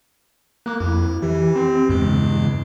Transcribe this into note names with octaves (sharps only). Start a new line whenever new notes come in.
A#3 D6 F#6
F2 E4
E3 G4
C4
E2 G2 C#3 G#3